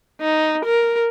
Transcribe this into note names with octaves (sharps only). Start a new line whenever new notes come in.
D#4
A#4